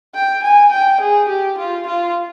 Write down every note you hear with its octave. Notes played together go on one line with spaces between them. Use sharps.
G5
G#5
G5
G#4
G4
F4
F4